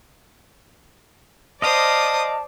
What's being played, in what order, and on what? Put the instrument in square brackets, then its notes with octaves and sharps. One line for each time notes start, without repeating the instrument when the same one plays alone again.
[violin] C5 D#6 [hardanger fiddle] D5 [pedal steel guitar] D#5 F5 [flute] A5